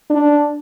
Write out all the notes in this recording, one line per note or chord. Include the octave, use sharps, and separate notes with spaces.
D4